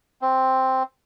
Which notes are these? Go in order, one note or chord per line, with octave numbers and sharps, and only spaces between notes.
C4